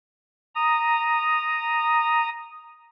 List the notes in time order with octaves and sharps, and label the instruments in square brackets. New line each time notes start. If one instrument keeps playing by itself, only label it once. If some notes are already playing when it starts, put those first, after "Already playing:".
[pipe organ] A#5 D#6